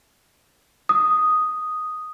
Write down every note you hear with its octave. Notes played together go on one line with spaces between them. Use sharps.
D#6